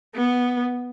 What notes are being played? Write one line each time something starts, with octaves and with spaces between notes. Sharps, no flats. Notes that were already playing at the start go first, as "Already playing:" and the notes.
B3